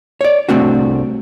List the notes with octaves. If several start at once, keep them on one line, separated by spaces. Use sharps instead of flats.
C#5 D5
C2 A3 C4 D4 F#4